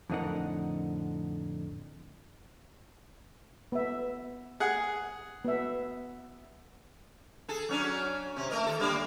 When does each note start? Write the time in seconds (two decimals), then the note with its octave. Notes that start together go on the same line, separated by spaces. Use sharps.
0.10 F2 A2 D3 D#4 A#4 F#5
3.72 B3 E5
4.60 G#4 F#5
5.45 B3 E5
7.48 G#4 A4
7.69 F#3 C#4 D4
8.36 C3 C#4
8.50 A3 A#4 D#5
8.67 E3 F3 A4
8.80 G3 A#3 D4